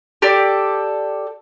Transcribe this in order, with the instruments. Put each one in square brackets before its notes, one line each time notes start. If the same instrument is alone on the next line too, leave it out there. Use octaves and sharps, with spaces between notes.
[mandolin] G4 A4 D5